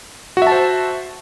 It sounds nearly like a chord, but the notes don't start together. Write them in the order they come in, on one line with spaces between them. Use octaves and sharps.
F#4 E5 A5 C5